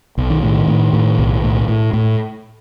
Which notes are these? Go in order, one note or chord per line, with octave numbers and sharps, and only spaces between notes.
B1
D#3
A2 D#3
A2
A2
B1
A2
A2
A2